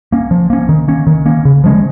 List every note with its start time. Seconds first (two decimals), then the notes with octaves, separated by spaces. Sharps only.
0.12 A#3 C#4
0.31 F3
0.50 A#3 C#4
0.69 D#3
0.88 A#3 C#4
1.07 D#3
1.26 A#3 C#4
1.45 C#3
1.64 F3 G#3 C#4